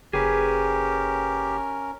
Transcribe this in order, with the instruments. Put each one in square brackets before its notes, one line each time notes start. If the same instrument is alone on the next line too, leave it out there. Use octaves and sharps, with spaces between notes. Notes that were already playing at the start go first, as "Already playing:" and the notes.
[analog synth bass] F#1 [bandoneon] C#4 A#4 [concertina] G4 [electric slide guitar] G#4 B4